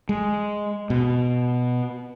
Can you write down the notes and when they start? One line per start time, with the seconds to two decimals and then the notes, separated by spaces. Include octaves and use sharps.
0.09 G#3
0.90 B2